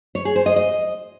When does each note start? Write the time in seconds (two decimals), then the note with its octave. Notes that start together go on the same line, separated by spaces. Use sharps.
0.15 C#5
0.25 G#4
0.36 C5
0.46 D#5
0.56 D#5